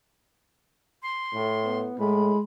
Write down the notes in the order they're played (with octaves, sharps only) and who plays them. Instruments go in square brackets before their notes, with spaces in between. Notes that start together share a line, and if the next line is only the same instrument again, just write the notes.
[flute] C6
[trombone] A2
[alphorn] B3
[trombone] A2 [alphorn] G#3 [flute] B5